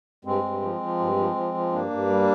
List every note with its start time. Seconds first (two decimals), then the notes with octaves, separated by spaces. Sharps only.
0.25 G2 G#3 C4
0.43 G2
0.62 F3
0.81 F3
0.99 G2
1.17 F3
1.35 F3
1.54 F3
1.72 G2 A#3 D4
1.90 G2
2.09 G3